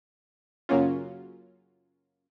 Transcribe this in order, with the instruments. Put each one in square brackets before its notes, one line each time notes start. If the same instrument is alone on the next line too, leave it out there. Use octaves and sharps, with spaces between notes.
[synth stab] F#2 C#3 F#3 A#3 C#4 F4